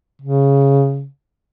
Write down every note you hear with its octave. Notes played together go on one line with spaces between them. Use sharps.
C#3